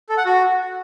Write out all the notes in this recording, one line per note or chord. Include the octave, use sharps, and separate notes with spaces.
A4
F#5
F#4